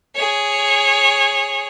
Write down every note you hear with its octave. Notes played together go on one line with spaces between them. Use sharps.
G#4 C#5